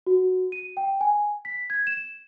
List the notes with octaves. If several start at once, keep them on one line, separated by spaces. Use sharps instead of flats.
F#4
D#7
G5
G#5
B6
G#6
E7